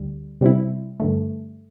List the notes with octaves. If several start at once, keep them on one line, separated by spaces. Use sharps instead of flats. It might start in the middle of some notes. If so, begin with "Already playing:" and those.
Already playing: D2 G3
C3 G3 C4 E4
G2 D3 A3